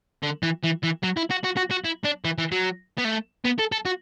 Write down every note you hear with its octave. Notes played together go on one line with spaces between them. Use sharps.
D3
E3
E3
E3
F#3
E4
F#4
F#4
F#4
F#4
E4
D4
E3
E3
F#3
B3
A3
B3
A4
A4
F#4